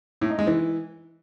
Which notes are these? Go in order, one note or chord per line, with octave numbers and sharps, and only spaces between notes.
A2
D#4
G#3
E3